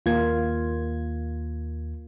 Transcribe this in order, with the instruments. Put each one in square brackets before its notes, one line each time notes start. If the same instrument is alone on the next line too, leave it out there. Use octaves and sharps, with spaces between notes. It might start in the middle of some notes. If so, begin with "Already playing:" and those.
[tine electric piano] D#2 G#6 [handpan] A#3 F4